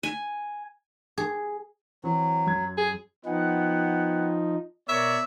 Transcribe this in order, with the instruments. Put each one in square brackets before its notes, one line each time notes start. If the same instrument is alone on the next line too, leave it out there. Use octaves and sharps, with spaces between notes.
[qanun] G#5
[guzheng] G#4
[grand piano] E3 C4 [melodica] F#3
[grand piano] F#2 G#6
[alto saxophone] G#4
[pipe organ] F3 D#4 [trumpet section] B3 F#5 G5
[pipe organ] B2 [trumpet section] A#4 C#5 D5 [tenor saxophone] E5